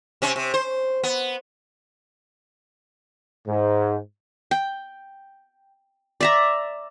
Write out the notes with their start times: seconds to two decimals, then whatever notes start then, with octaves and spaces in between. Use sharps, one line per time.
0.22 C3 C#4
0.36 C3
0.54 C5
1.04 B3
3.47 G#2
4.51 G5
6.21 D5 E5 A#5